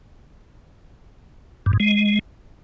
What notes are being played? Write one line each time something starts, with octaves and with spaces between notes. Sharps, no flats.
G2
G#2
G#3